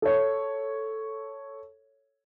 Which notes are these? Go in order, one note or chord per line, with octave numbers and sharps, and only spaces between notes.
A4 C#5